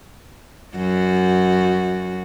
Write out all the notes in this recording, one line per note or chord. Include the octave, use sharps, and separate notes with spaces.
F#2 F#4